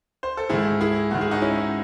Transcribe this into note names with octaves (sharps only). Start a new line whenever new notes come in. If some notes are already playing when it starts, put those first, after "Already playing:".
C5
A4
G#2 D#3 E4 G#4
E4 G#4
G#2 D#3 F#4
G#4
D#4 F#4
C#4 E4